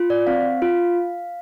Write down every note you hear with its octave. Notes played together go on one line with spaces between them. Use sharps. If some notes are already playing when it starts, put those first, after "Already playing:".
Already playing: F4
D5
C4 F5
F4